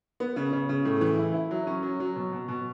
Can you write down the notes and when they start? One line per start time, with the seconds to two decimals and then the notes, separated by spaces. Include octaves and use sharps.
0.20 B3
0.36 C#3
0.53 C#3
0.69 C#3
0.85 A2
1.01 E3
1.18 E4
1.34 E4
1.51 F#3
1.67 C#4
1.83 F#3
2.00 F#3
2.16 B2
2.32 B2
2.48 B2